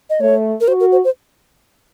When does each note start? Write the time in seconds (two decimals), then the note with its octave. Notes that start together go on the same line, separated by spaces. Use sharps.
0.10 D#5
0.20 A3 C#5
0.61 A#4
0.67 F#4 C5
0.80 A#4
0.92 C5
1.04 C5